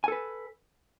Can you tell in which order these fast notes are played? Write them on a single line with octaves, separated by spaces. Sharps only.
G#5 A4 B4